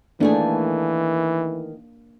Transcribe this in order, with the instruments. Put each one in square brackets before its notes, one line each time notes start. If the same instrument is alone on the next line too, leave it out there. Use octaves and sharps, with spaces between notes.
[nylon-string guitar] D#3 A3 G#4 [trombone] E3 [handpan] A#3 D4